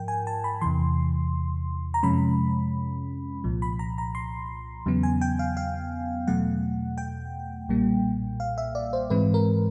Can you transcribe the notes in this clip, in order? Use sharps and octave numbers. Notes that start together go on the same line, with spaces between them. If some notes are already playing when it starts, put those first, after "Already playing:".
Already playing: G#2 F3 A#4 G5
G#5
A5
B5
E2 C3 E3 C6
A#5
F2 C3 F3 G#3 C#4 B5
C2 A#2 F3
B5
A#5
A#5
C6
E2 C#3 F#3 B3
G#5
G5
F5
F5
E2 B2 F#3 A3 F#5
G5
B1 A#2 G3 A#3
F5
E5
D5
C5
G#2 E3 G#3 C4 B4
A#4